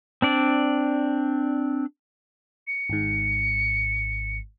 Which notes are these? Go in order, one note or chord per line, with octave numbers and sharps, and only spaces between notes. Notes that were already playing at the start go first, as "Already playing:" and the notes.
C4 D4 D5
C#7
G#1 G#2